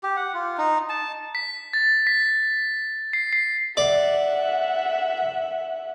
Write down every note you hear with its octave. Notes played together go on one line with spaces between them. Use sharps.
G4
F#5
F4
D#4
A5
B6
A6
B6
C7
C7
D5 E5 F#5